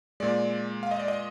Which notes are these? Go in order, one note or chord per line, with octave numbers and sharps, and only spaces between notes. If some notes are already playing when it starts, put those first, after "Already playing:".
A#2 G#3 D5
F5
D#5
D5
D#5